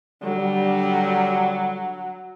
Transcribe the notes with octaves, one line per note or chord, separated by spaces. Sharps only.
D3 F#3 G3